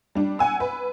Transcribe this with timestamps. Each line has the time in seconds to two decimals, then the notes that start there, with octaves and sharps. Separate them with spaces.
0.15 G3 D4
0.39 F#5 G#5 E6
0.60 B4